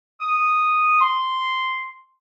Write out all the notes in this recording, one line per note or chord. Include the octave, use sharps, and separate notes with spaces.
D#6
C6